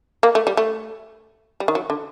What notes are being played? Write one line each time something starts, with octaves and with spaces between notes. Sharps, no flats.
A#3
A3
G3
A3
G3
D#3
F#3
D3